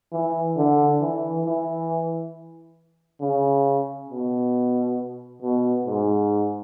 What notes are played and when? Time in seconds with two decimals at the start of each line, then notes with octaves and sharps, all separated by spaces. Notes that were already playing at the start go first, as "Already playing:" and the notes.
0.12 E3
0.57 D3
1.01 E3
1.45 E3
3.21 C#3
4.10 B2
5.42 B2
5.86 G#2